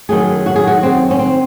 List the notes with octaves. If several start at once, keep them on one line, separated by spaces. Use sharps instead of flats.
F#2 D#3 F#3 A3 G#4
F#4
G#4
F#4
C4
C#4
C4